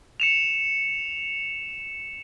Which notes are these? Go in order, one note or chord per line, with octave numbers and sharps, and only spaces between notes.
C#7 E7 F7